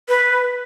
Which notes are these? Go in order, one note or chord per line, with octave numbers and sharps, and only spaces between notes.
B4